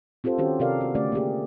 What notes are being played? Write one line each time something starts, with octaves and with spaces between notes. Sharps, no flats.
C4 F4 G4 A4 C5
D#3 C#4 F#4 G4 C5
C3 G4 A4 A#4 D5 F5
B3 F#4
D3 A3 C#4 G4 D5
A#3 C#4 G4 G#4